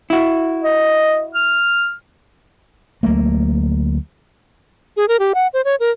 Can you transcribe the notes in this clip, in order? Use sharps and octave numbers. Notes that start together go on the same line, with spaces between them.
E4 F#4
D#5
F6
D2 F#3 A3 A#3
G#4
A#4
G4
F#5
C5
C#5
A#4